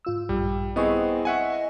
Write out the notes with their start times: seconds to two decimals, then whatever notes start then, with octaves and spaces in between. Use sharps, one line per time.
0.05 G#2 F4 E6
0.29 A#1 G2 G3
0.76 B3 C4 E4 G#4 D#5 C#6
1.25 E5 F#5 G#5